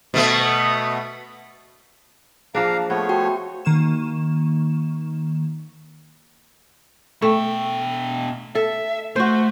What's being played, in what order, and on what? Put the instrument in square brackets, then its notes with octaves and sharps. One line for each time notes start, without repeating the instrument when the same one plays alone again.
[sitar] B2 A3 B3
[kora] F3 A#3 D4 [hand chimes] G#4 [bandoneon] F5 A#5
[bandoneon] F3 A3 C#5 [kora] B3
[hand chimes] F#4 G5
[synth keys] D#3 A#3 C#6 E7
[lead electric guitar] B2 G5 [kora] A3
[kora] A4 [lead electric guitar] E5
[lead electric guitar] A3 [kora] F#4 C5